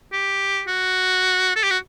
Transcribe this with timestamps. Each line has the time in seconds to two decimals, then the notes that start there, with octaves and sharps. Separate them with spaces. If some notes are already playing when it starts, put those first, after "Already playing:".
0.12 G4
0.67 F#4
1.56 A4
1.63 G4
1.70 F#4